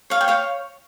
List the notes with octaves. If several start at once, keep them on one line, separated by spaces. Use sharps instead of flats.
C#5 F5
G5
C#5 F5